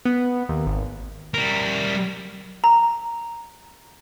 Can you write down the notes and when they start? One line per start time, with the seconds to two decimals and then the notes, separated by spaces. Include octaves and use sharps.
0.05 B3
0.49 D#2
0.66 G#1
1.34 G3 A#4
2.64 A#5